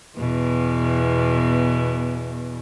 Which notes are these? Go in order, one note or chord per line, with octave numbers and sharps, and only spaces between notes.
E2 B2